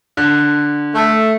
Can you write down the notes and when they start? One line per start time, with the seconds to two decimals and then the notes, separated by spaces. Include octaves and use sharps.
0.17 D3
0.95 A3